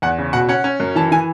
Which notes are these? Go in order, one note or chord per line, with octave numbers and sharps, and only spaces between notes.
E2 F#5
C#3
B2 F#5
C#4 F#5
C#4
F#2
E3 A5
E3 G#5